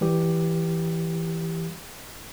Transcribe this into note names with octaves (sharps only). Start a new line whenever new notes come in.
E3 G3 G4